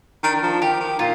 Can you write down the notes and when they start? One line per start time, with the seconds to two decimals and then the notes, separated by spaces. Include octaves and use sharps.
0.23 D#3 D4
0.35 D#3
0.43 F3
0.61 D#3 G4
0.80 D#3
0.99 A#2 F4